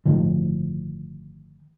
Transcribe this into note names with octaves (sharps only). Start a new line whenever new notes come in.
G1 A2 D#3 F3